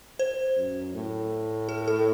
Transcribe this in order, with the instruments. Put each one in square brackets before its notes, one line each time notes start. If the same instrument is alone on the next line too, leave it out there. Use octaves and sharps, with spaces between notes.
[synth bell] C5
[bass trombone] F#2
A2
[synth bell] A4
A4